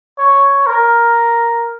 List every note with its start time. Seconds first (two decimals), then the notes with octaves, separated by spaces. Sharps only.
0.19 C#5
0.66 A#4